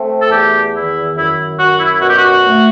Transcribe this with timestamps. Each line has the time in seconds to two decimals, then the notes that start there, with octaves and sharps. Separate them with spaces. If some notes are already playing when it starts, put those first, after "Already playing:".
Already playing: A3 C4
0.22 A4
0.30 E2 G4
0.73 D#3 E4
1.16 F#2 E4
1.58 F#2 F#4
1.80 E4
2.01 B2 F#4
2.09 G4
2.17 F#4
2.44 A3